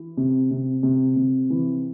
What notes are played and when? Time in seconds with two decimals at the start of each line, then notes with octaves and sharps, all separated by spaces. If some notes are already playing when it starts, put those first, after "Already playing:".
Already playing: E3
0.17 C3
0.51 C3
0.83 C3
1.16 C3
1.50 E3